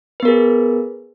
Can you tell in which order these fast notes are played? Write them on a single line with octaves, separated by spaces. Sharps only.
B4 B3 A#4 G#4